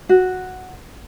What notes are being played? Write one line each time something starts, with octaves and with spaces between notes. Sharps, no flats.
F#4